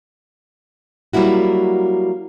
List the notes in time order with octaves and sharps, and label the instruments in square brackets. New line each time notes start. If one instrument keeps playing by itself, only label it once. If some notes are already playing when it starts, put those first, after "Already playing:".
[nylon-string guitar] F#3 G3 A#3 E4 F#4